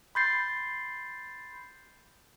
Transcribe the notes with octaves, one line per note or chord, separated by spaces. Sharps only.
B5 C6 G6 A6 C7